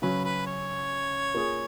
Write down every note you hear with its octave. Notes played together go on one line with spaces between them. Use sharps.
C#3 F#3 C#4 B4
B4
C#5
A#3 F4 G#4